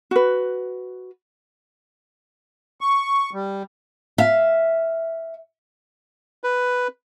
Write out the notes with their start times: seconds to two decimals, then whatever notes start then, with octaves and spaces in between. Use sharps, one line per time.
0.11 F#4 B4
2.81 C#6
3.33 G3
4.18 E5 F5
6.44 B4